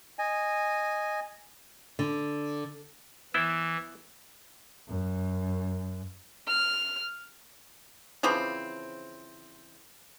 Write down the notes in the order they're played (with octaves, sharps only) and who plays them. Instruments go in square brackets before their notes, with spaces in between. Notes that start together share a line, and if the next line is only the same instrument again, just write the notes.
[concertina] D#5 G#5
[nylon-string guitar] D3
[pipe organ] E3 [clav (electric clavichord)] B3 E4 C5 [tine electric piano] E6
[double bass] F#2
[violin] F6
[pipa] C#3 E3 F3 C4